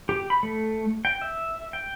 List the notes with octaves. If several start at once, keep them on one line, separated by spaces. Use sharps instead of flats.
G4
B5
A3
G5
E5
G5